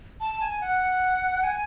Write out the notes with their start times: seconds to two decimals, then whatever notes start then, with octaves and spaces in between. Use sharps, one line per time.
0.20 A5
0.41 G#5
0.61 F#5
1.43 G#5